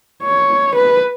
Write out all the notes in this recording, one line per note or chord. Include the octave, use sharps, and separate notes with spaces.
C#5
B4